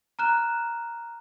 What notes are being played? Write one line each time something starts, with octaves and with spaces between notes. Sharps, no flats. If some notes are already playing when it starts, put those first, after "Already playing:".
A#5 F6 F#6 E7